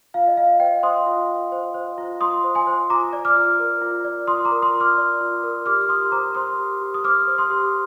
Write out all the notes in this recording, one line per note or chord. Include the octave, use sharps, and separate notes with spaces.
F4 F5
D#5
F4 F5
C5 D#5 G5
C5 C6 D#6
F4
F4
C5
C5
F4
F4 C6 D#6
C5
G#5 C6
C5
F4 A#5 D6
D5
D6 F6
F4
A#4
F4
D5
F4 C6 D#6
A#5 D6
A#4
C6 D#6
F4
D6 F6
D5
F4
A#4
G4 D6 F6
F6
G4 C6 D#6
C5 A#5 D6
C5 C6 D#6
G4
G4
D#6
C5 D6 F6
C5
C6 D#6
G4